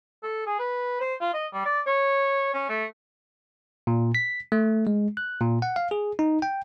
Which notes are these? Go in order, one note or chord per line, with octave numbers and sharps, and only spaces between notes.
A4
G#4
B4
C5
F4
D#5
G3
D5
C#5
C#4
A3
A#2
B6
A3
G#3
F#6
A#2
F#5
F5
G#4
D#4
G5